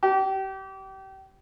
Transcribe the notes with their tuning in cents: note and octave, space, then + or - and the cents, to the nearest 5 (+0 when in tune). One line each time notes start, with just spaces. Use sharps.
G4 -30